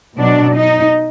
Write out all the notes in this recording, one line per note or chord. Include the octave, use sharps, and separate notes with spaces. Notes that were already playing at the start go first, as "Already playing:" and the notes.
B2 F#3 D4
D#4